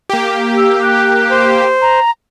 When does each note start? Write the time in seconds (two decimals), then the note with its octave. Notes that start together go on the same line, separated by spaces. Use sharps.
0.09 A#3 G4
0.57 E6
0.82 F#6
1.31 C5
1.82 A#5